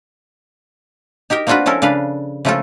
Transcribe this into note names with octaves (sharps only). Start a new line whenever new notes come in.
D#4 G4 A#4 G5
A#3 C4 D4 F4 F#4 B4
F3 C#4 E4 A4 A#4
C#3 D4 B4 F5
C#3 F3 A3 A#3 F4 A4